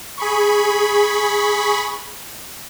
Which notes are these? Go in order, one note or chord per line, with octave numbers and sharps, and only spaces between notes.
G#4 B5 C#6